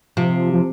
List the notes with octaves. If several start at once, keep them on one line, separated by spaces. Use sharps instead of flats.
C3 F3
F3